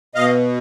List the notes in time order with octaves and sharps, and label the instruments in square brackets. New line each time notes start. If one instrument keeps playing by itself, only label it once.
[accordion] B2 D#5 F5